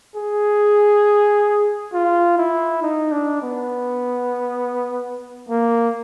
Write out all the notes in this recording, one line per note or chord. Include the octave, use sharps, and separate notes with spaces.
G#4
F4
E4
D#4
D4
B3
A#3